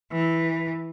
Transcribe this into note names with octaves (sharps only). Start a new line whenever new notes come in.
E3